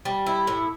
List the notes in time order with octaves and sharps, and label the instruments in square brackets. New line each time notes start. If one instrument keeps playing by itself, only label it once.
[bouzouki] G3
E4
A2